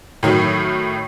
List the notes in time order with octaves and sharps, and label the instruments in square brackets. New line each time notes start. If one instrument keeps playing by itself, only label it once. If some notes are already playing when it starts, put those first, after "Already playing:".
[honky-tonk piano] A2 D#3 F#3